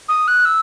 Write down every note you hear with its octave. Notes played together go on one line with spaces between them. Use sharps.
D#6
F#6
E6